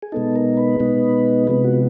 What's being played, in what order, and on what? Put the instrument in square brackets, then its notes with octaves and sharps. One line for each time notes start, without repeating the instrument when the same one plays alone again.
[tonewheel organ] G#4
B2 G#3 B3 D#4 A4
A#4
B4
B2 G#3 B3 D#4
C3 F3 G#3 B3 B4
F#4